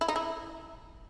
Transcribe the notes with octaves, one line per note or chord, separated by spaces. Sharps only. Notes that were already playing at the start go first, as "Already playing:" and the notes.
E4
D#4
E4